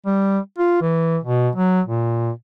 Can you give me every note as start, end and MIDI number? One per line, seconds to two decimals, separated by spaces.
0.06 0.38 55
0.58 0.79 65
0.82 1.17 52
1.23 1.49 47
1.55 1.81 54
1.86 2.31 46